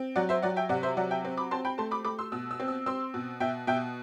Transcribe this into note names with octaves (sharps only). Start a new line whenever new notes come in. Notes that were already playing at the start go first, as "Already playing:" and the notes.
Already playing: C4
F#3 D5 F#5
C5 E5
F#3 D5 F#5
E5 G5
C3 D5 F#5
C5 E5
F#3 D5 F#5
E5 G5
C4
B5 D6
C4 A5 C6
G5 B5
A3 A5 C6
B5 D6
A3 B5 D6
C6 E6
B2 E6
E6
C4
E6
C4 C6 E6
B2
B2 E5 G5
B2 E5 G5